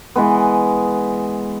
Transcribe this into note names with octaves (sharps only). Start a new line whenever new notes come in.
E3 G#3 B3